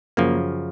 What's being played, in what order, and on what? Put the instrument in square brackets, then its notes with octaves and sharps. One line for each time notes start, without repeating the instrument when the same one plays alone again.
[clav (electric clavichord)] F#2 C#3 F3 A#3